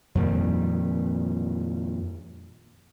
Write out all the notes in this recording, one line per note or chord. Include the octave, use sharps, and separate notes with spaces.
F2 A#2 D#3 G3